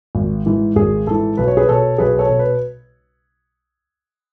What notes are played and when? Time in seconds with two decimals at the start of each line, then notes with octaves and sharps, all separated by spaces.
0.15 G#1
0.46 G#2 E3
0.76 G#1 G#4
1.07 G#2 E3 A4
1.37 B1 B4
1.48 C#5
1.57 G#4 B4
1.68 B2 A4 C#5
1.98 B1 G#4 B4
2.19 A4 C#5
2.29 B2
2.39 B4